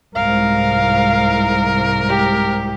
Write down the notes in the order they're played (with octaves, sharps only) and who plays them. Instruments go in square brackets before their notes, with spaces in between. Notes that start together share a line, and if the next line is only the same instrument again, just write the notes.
[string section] C2 G#2 [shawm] A#4 [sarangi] F5
[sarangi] G4